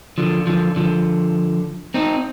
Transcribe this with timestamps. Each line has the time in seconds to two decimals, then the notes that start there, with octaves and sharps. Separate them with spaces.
0.18 D3 F3
0.47 D3 F3
0.76 D3 F3
1.94 C4 D#4